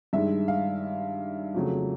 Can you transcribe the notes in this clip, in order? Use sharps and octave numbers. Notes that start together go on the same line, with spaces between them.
G2 D#3 G#3 E5
F5
F2 C#3 F#3 A3